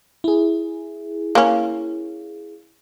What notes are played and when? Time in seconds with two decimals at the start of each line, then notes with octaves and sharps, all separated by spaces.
0.24 E4 G#4
1.35 A#3 C#4